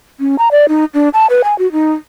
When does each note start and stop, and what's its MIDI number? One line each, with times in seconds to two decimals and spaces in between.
0.20 0.36 61
0.39 0.48 82
0.52 0.66 74
0.69 0.85 63
0.94 1.09 62
1.14 1.26 81
1.30 1.42 71
1.44 1.57 80
1.59 1.70 66
1.72 1.93 63